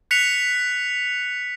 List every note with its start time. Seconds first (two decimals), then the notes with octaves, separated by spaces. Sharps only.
0.11 F#6 B6 C#7 F7